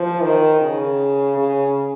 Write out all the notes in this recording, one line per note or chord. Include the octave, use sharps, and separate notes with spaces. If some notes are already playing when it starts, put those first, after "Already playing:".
Already playing: F3
D#3
C#3
C#3